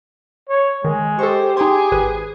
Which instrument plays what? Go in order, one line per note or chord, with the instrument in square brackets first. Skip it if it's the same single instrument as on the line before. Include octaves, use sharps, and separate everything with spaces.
[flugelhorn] C#5
[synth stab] D#3 [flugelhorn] G#3
[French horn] G4 [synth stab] A4 C#6 [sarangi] C5
[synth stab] D#4 G5 C6 [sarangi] G#4 [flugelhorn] G#5
[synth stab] G#1 B4 D#7